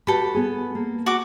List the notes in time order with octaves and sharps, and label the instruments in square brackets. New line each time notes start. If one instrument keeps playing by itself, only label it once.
[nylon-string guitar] F#4 G4 B4 [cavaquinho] A4 B5
[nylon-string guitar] B3 G#4
A#3
[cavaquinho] F#4 D6